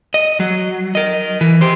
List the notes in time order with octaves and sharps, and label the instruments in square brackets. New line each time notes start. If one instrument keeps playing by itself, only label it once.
[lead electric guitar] D#5
F#3
A#4 D#5
E3
G4 C5